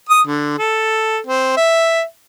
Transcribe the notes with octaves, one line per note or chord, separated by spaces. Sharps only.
D#6
D3
A4
C4
E5